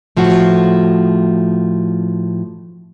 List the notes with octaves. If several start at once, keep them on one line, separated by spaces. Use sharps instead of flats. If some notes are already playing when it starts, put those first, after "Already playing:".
A2 F3 A3 F4 F#4